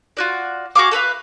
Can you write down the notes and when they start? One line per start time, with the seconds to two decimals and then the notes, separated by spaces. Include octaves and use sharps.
0.17 F4 F#4 D5
0.75 F#4 G#4 F5 D6
0.91 A4 B4 E5 F5